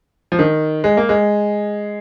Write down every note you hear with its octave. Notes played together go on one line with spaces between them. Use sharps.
F3
D#3
G#3
A#3
G#3